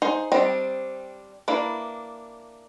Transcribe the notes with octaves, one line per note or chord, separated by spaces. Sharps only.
D#4 G#4 C5
G3 C4 D4 D#5
A#3 D4 E4 B4